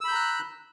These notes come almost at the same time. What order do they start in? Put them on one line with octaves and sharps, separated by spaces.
E6 B5 G6 A#5 F#6